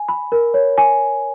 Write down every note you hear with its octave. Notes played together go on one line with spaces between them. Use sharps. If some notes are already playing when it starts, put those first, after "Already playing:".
Already playing: G#5
B5
A#4
C#5
G#5